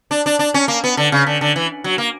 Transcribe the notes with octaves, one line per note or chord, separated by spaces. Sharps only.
D4
D4
D4
C#4
A#3
B3
D3
C#3
D3
D3
E3
F#3
A#3